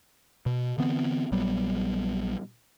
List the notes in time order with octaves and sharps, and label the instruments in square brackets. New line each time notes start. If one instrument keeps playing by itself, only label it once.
[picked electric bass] B2
D3 E3 B3 C4
A#1 F#3 G3 B3